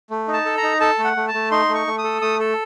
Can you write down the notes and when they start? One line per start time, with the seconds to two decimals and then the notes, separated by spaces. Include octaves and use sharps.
0.10 A3
0.28 D#4
0.33 A5
0.45 A4
0.57 A#5
0.63 D#4
0.80 A4 A5
0.99 A3
1.04 F#5
1.17 A3
1.28 A5
1.34 A3
1.51 D#4 C6
1.69 A3
1.75 C#6
1.87 A3
1.98 D#6
2.04 A4
2.22 A3 D#6
2.39 A4